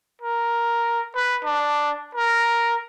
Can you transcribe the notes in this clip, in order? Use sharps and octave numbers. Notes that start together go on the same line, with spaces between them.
A#4
B4
D4
A#4